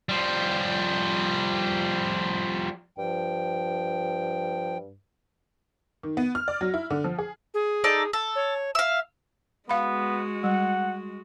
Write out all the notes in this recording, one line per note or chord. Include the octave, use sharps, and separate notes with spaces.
F3 G3
G2 F3 G5
D#3
B3
F6
D5
F#3
E4
D3
F3
G#4
G#4
D#4 A4 D5
A4
C#5
E5 F5 E6
G#3 B3 F#4 F5 B5
G3 F#5